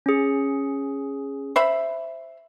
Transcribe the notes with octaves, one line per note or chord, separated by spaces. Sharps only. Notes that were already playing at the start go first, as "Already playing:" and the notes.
C#4 G#4
C5 E5 B5